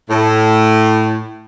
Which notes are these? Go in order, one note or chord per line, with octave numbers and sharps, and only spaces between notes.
A2